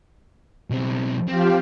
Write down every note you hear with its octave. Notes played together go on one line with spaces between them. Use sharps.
B1 C4
F3 C4 F4 G4